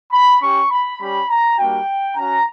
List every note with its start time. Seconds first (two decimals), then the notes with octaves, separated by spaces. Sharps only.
0.12 B5
0.40 C#4 G4 C#6
0.70 B5
0.99 G3 C#4 G4 B5
1.29 A#5
1.58 G3 A#3 D4 F#4 G5
2.17 C#4 F#4 A#5